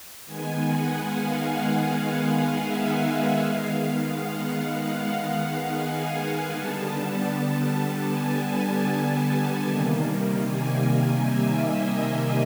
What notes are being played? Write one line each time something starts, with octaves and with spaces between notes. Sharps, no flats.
D#3 G#3 B3 G#5
F#5
F5
E5
D#3 G#3 B3 F5
F#5
G#5
G#5
D3 G3 B3 A5
G#5
C3 D#3 G3 A#3
G#5
E5
D#5
E5